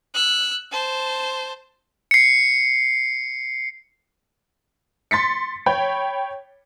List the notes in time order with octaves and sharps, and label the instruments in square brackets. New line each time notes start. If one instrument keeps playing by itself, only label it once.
[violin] E6 F#6
C5 A5
[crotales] C7 C#7
[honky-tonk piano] C6 A6 B6 C#7
C#5 G5 B5